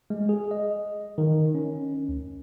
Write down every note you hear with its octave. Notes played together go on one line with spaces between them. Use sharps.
G#3
G#4
D#5
D#3
C#4
D2